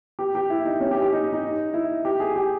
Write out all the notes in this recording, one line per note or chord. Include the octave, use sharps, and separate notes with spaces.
G4
G4
E4
D#4
C#4
G4
G4
D#4
D#4
E4
G4
G#4
G4